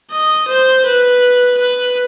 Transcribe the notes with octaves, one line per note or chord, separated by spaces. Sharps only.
D#5
C5
B4
B4